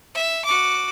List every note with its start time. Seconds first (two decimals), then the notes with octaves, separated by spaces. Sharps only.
0.15 E5
0.45 F#4 D6